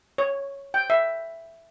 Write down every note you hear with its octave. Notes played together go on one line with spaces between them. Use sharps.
C#5
G5
E5